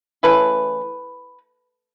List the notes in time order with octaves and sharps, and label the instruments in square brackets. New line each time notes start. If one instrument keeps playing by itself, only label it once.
[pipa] C#3 E3 A3 E4 B4